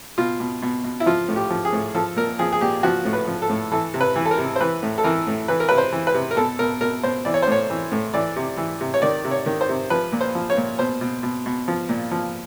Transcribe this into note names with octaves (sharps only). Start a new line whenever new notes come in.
B2 F4
B2
B2
B2
E4
F3 F4
A2
G4
F3
G#4
A2
F3 A4
A#2 A#4
F3 G#4
G#4
A#2 G4
F3 F#4
A2
B4
F3
A4
A2
E3 A4
C3
B4
E3
A4
A#4
C3
C5
E3 B4
A2
A4
E3 A#4
A2
E3 B4
A#4
C3 B4
C5
E3
B4
C3
A#4
B2 A4
B2 A#4
B2 A#4
B2 C5
E3 D5
C#5
C5
A2 C#5
E3
A2
E3 D5
C3
E3
C3
C#5
D#3 D5
C3
C#5
D#3
C5
C3
F3 B4
A#2
C5
F3
C#5
A#2
B2 C5
B2
B2
B2
F3
A#2
F3